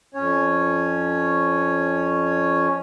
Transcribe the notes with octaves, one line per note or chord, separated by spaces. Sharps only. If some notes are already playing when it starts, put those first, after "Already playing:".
F2 C#4 C#5